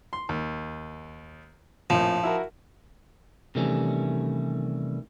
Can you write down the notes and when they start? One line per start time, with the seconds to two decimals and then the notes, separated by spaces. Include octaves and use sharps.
0.13 C6
0.29 D#2
1.90 A#1 F2 A2 F3
2.23 E4 F#4 A#4
3.55 C3 D#3 E3 G3 A3 C#4